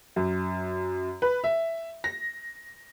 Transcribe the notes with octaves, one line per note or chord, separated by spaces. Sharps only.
F#2
B4
E5
A#6